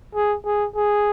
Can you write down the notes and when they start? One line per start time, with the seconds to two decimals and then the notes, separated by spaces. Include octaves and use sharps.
0.14 G#4
0.45 G#4
0.75 G#4